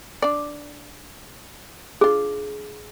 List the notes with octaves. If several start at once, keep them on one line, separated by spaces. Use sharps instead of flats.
D4 D5
D4 F4 G#4